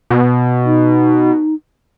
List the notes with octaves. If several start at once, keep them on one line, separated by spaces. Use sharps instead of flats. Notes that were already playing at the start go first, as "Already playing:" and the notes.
B2
D#4